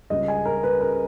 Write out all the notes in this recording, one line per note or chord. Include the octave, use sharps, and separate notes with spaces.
C#2 C#3 G3 D#5
G#5
A#4
B4
A#4